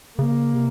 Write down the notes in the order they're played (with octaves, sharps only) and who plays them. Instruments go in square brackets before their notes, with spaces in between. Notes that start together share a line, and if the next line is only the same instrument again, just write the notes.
[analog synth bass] C#3 [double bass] A#3
[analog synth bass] C3